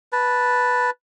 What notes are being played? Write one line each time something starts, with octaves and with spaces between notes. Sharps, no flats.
B4 A5